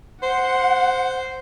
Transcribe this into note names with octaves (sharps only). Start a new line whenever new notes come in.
C5 F#5